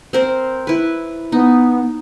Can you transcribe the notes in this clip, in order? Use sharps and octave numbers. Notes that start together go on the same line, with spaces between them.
C4 A#4 C5
E4 B4
B3 D#4